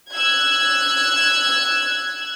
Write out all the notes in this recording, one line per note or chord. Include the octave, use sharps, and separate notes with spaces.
E6 F#6 G#6